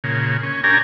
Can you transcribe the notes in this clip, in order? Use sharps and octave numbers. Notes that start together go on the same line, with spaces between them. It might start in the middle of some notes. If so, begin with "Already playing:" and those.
A#2 C#3
C#4
C#4 D4 G4 A#4 G#5 A#5